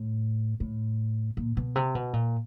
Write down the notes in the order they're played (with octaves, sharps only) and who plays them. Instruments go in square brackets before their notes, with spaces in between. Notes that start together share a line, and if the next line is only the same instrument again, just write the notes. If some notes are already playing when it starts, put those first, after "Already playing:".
Already playing: [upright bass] A2
A2
A#2
B2
C3
B2
A#2